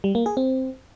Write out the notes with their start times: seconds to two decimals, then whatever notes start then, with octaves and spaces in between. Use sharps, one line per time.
0.04 G3
0.15 A#3
0.26 G#4
0.37 C4